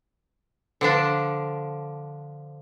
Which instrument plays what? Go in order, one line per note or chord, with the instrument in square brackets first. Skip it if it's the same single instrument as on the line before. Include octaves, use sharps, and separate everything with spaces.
[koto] D3 F3 D4